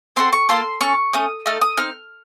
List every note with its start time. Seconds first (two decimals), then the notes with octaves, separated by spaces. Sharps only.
0.16 C4 F#4 A4 C6
0.33 C#6
0.49 A#3 F4 A4 C6
0.81 C#4 A4 C#6
1.13 A3 C#4 D#6
1.46 A3 D#4 A4 F6
1.61 D#6
1.77 C4 D#4 F6